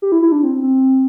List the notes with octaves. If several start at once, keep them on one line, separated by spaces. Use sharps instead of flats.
G4
E4
E4
D4
C4
C4